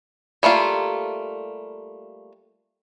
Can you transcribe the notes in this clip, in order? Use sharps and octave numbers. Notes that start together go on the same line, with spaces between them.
G3 A3 A#3 F4